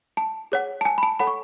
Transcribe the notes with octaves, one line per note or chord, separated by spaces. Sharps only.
A5
G#4 C#5 F#5
A5
G#5
B5
A5
A4 C#5 F#5 B5
C#6